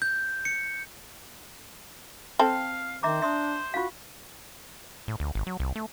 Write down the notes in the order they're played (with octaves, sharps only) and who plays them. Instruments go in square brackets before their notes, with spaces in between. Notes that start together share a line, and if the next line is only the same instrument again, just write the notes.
[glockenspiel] G6
C#7
[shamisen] C4 A4 [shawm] F5
[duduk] D#3 [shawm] C5 [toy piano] E5 A#5 D6
[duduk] D4 [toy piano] E5 C6 D#6
[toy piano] F4 F5 [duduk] F#4
[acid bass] A2
D2
G#1
F#3
C2
A3